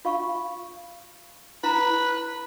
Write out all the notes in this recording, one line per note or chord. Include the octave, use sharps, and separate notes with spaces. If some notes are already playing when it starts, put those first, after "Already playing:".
F4 F5 C#6
E4 B4 A#5